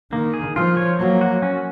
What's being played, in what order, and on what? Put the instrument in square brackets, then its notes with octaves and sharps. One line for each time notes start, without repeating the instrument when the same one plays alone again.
[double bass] D#3 [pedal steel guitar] A#3
[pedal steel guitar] G#4
[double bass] F3 [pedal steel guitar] F4
[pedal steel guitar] C#5
[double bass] F#3 [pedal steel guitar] A#3
[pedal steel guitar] F#4
C#4